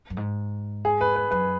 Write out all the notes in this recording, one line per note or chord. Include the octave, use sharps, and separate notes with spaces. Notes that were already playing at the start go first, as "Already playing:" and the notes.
F#2
G#2
G#4
B4
B4
F#2 B4